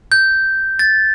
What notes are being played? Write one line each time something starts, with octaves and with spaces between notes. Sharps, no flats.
G6
A6